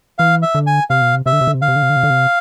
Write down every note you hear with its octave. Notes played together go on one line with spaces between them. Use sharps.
E3 F5
E5
D3
G#5
C3 F5
B2
C3
C3 E5
D3
C3
D3
C3
D3 F5
C3
D3
C3
D3
C3
D3
C3